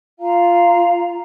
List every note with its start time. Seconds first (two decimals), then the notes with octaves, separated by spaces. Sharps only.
0.19 F4 F5 A#5